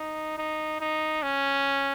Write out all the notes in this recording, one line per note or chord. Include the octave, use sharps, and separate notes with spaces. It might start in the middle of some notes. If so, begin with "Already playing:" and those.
Already playing: D#4
D#4
D#4
C#4